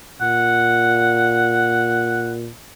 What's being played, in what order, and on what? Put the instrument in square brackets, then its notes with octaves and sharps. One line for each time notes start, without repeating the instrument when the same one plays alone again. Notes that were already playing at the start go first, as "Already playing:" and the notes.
[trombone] A#2 [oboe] F#5